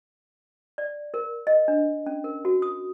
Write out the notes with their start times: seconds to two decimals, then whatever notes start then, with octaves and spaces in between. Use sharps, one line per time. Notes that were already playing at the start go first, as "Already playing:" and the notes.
0.78 D5
1.14 A#4
1.47 D#5
1.68 D4
2.06 C#4
2.24 A#4
2.45 F#4
2.62 D#6